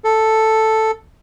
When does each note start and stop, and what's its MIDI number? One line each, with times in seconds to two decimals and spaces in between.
0.04 0.91 69